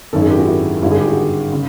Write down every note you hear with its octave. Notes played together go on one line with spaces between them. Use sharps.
G#1 F#2 D#3 A4
G#4
G4
F#4
E4
G#1 G2 D3 G3 E4
G#4
G4
F#4
C#3